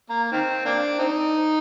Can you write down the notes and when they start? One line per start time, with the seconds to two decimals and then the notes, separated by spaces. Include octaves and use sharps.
0.09 A#3
0.32 D#3 C4
0.65 A#3 D4
0.99 C4 D#4